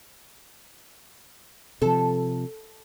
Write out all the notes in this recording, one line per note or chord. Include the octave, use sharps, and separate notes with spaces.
C3 F3 A4